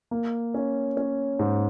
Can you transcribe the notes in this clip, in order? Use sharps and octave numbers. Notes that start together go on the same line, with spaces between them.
A#3
C#4
C#4
G#2